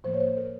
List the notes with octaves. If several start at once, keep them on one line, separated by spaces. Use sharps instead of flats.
A2 F3 A#3 C5
C#5
C5
A#4